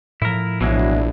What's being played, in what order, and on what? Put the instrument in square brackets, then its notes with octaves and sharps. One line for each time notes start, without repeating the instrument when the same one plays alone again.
[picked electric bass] A2 F3 [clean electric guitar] E4 A#4
[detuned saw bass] A#1 [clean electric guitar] B2 E3 G#3 [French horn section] F#3 D4 E4